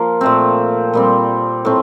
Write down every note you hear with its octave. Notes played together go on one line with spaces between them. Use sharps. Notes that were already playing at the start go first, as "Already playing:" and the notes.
Already playing: F3 A#3 F4
A#2 A3 C4
A#2 G3 C4
A2 A3 C4